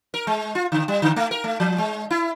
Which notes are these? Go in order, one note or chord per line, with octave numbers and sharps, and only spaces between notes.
A#4
G#3
F4
D3
G3
D3
A3
A#4
A3
F3
G#3
E4